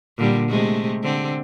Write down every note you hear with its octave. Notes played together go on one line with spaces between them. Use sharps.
A#2 D3 G3
C3 G#3 A3
D3 C4